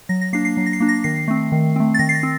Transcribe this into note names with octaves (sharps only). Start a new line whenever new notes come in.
F#3 A#6
A#6
A#3 D4 C7
C7
F#3
A#6
C7
A#3 D4
A#6
D#3 C7
A3 C4
D#3
A3 C4
A6
D#3 A#6
C7
A#6
C4